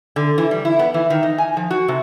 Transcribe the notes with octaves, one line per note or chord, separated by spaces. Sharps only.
D3
E3
G3
E4
B3
E3
D#3
D#4
G#5
F3
F#4
C3